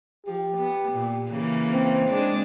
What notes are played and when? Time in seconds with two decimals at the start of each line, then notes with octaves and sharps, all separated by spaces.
0.26 F3 G4
0.57 B3
0.92 A#2
1.29 C#3 E3 A#3
1.72 C4
2.09 C#3 G#3 D4